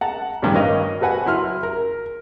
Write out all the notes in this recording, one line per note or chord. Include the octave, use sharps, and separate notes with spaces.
F#5 A5 A#5
A1 G2 D#3
A#4 B4 C#5 D#5 F5
F#4 A4 B4 F#5 G#5
F#3 E4 C6 F6
A#4